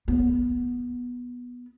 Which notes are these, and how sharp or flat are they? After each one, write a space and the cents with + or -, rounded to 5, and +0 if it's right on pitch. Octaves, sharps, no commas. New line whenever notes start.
B3 -10